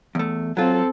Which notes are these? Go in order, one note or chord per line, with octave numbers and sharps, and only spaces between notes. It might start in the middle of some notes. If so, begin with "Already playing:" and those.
E2 A3
F#3 C4 F4 A4